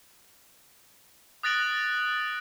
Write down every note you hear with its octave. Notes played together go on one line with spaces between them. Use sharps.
D#6 F#6 A6 A#6 D7 F#7